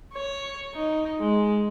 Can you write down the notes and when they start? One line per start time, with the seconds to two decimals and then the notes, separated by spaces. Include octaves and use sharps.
0.14 C#5
0.74 D#4
1.20 G#3